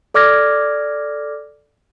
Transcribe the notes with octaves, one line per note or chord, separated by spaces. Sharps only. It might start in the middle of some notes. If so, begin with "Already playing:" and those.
A4 D5 D6 F6 G#6 A#6